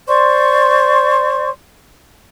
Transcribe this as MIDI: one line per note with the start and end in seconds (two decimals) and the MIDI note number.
0.07 1.49 72
0.07 1.49 74
0.07 1.49 84
0.07 1.49 85